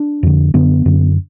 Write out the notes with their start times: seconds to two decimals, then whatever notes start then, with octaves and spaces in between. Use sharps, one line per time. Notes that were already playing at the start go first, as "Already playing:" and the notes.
Already playing: D4
0.23 F2 D3
0.54 F#2 D3 B3
0.86 F#2 D3